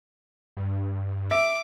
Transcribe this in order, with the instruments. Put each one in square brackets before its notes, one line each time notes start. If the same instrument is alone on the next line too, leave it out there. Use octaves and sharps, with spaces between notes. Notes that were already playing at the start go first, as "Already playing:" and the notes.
[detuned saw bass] G2
[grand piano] E5 [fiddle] D6